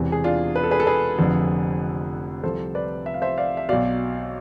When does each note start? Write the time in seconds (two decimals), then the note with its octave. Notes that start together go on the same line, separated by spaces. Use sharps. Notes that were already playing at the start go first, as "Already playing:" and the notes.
Already playing: E1 E2 C3 E3
0.12 G#4
0.24 D4 F4
0.56 B4
0.63 A4
0.71 G#4 B4
0.80 A4
0.87 G#4 B4
1.18 F1 F2 D3 F3
2.43 C2 C3 F3 A4 C5
2.75 B4 D5
3.06 E5
3.14 F5
3.22 C5 E5
3.38 D5 F5
3.57 E5
3.69 B1 B2 D5 F5